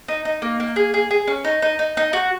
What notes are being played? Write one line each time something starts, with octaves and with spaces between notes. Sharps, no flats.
D#4
D#4
A#3
A#3
G#4
G#4
G#4
C#4
D#4
D#4
D#4
D#4
F#4